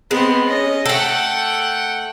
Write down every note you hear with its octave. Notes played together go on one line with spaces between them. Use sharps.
G#3 B3 C4
C#4 D#5
A3 A4 F#5 G5